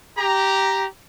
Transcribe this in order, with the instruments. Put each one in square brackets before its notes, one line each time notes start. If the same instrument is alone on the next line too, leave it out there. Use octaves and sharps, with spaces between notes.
[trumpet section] G4 A#5